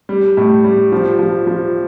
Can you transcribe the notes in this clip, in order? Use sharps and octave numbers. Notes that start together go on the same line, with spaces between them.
G3
A2
G3
F3
F3
F3